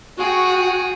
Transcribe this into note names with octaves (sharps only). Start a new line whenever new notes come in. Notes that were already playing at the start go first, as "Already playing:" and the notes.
F#4 G#4 G5